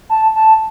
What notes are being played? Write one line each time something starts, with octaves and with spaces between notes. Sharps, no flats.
A5
A5